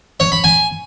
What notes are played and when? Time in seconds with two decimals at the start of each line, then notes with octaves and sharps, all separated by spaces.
0.20 C#5
0.32 B5
0.44 G#5